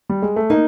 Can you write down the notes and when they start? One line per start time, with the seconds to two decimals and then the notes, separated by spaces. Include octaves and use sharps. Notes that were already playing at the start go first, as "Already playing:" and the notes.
0.09 G3
0.22 G#3
0.36 A3
0.50 A#3 D#4